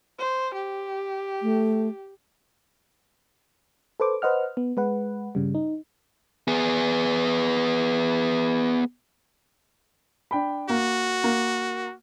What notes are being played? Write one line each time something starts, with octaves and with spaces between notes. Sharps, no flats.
C5
G4
A3
A4 B4 C5 D6
B4 C5 D#5 F#5 F6
B3
G#3 B4 F#5
G2 C#3 G3
D#4
B3 G#4
D4 G5 B5
A#3 F#4
A#3